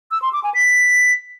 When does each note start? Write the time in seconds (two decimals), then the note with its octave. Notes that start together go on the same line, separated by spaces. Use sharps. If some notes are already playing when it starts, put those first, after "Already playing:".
0.11 E6
0.22 C6
0.33 D6
0.44 G#5
0.54 B6